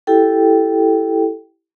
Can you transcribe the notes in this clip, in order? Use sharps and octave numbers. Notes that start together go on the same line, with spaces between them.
E4 G4 A4 G5